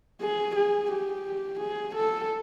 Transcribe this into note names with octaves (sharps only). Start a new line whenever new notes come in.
G#4
G#4
G4
G#4
A4